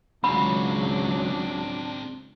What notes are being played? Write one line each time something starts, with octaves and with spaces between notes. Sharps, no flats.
C#2 F#3 C4 D4 G#4 B5